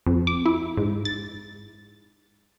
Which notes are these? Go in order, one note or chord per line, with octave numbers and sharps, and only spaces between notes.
F2
D6
E4
G#2
A6